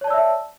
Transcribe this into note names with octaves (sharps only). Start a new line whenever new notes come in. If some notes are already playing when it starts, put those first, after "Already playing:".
C#5 D5 E5 A5 E6